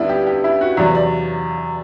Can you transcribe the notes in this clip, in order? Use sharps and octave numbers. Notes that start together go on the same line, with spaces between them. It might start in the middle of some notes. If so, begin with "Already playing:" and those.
Already playing: D2 G3 B3 D4 E4
G4
G4
E4
F#4
E2 C3 F#3 D5
D5